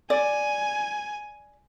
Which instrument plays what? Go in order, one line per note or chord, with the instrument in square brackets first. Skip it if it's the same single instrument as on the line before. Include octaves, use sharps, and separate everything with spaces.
[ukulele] D5 [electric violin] G#5